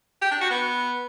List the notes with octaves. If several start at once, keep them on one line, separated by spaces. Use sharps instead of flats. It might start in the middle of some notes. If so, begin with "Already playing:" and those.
G4
D4
F#4
B3